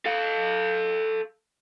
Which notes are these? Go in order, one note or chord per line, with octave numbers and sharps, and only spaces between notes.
A4 F5